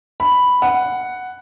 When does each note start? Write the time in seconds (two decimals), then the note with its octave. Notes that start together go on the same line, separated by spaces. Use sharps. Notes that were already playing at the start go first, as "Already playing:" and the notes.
0.20 B5
0.62 F#5